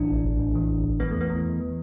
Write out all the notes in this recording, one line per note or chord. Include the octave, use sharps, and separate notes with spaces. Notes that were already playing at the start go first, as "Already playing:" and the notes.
Already playing: B1 A2 E3 D4
A1
A1
A2
E3
A1
A1
E3 B3
E2 A3
B3
E3
E2
E3